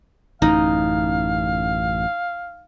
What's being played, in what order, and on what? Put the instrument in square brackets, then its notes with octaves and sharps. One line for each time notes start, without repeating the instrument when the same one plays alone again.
[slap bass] A1 F#2 [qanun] D#4 [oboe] F5